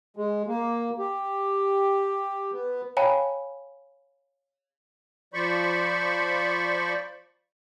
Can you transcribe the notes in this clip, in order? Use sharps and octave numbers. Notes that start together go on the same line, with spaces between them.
G#3
A#3
G4
B3
C#5 F5 G5 G#5 A#5 B5
F3 C5 D5 B5 C#6